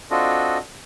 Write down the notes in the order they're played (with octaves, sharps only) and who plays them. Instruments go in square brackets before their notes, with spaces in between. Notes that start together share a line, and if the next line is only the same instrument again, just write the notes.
[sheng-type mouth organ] C4 D4 F4 F#4 A4 D#5